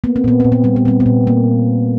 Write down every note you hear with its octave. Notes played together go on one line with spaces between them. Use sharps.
A#3 B3
C4
A#2 B3
A#2 C4
B3
G3 C4
B3
G3 C4
B3
A#2
A#3